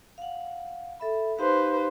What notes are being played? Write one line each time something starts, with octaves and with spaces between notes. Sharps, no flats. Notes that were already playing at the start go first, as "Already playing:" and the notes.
F5 F#5
A4 E5 B5
D#4 G4 B4 C5 F5